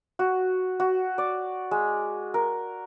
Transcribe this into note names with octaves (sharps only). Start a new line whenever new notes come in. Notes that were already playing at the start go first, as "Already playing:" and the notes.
F#4
F#4
D5
G#3
A#4